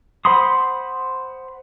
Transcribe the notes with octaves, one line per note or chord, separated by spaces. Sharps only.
C5 F#5 B5 C6 D#6